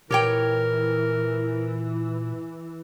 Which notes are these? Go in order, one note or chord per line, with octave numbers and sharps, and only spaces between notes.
A#2 E3 G4 A#4 C#5 G5